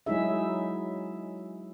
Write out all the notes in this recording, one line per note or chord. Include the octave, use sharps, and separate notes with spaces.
F#3 G#3 D#4 E4 G#4 E5